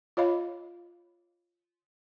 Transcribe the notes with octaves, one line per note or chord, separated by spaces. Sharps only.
F4 C#5 D#5 F5 B5